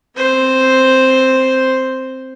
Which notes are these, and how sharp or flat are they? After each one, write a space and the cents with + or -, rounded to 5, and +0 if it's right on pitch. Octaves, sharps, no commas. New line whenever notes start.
C4 +0 C5 +0